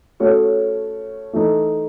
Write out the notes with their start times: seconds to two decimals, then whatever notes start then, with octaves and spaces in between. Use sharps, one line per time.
0.20 A3 C#4 F#4 C#5
1.33 E3 A3 D#4